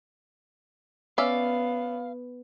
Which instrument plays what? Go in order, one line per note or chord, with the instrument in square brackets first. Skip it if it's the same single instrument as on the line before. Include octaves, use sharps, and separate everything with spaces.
[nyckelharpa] B3 [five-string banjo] C#4 D5 E5 [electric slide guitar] F5